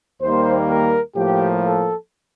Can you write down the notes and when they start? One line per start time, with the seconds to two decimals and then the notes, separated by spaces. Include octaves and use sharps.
0.22 D#2 D#3 G3 A#3 C5
0.69 A#4
1.16 A2 F3 A#3 G4
1.64 A4